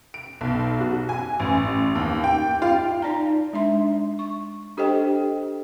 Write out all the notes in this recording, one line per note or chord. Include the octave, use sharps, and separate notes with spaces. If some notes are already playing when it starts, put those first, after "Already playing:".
D7
B1
F#4
G#5
A1
D#2
G5
F4
D#4 D5 A5 A#5
G#3 D4 E5 C6
C#6
D4 G4 A4 C5 D#5 G5